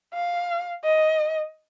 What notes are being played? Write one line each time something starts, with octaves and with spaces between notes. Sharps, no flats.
F5
D#5